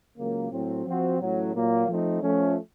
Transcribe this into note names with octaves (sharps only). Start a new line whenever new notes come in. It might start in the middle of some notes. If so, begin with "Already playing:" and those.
C#2 C#3 F#3 A#3
A2 F#3 C4
F3 C4 F#4
A1 A2 F#3
A#2 F#3 A#3
F3 A3 C4 D#4
F3 A3 C#4